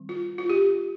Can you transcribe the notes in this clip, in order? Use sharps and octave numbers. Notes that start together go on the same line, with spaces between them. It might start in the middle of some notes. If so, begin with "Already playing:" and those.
Already playing: D#3 G3 C4
F4
F4
G4